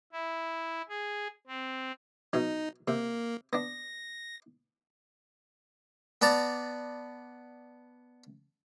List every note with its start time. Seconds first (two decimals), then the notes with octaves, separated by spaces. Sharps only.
0.12 E4
0.89 G#4
1.47 C4
2.33 B2 F#3 D#4
2.88 C3 A#3
3.53 B3 D4 A#6
6.22 B3 D5 A5 A#5